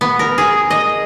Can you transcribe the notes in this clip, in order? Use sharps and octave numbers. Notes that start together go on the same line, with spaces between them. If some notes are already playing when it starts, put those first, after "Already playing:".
B3
A#4
G#4
D#5